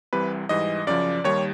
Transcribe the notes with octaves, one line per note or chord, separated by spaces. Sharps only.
C2 C3 E3 G3 B4
G#2 E3 G3 D#5
F#2 C#3 F3 D5
D#2 D#3 G3 C#5